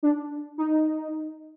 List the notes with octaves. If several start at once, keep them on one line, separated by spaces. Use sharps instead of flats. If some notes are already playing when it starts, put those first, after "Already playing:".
D4
D#4